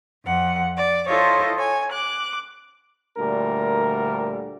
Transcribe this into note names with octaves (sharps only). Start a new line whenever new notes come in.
F2 F#5
D5
E4 F4 A4 C5 C#5 D#5
C#5 G#5
D6 F#6
D2 A#2 D3 G3 A#4